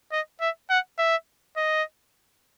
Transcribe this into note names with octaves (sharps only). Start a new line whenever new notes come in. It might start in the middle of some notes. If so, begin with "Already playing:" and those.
D#5
E5
F#5
E5
D#5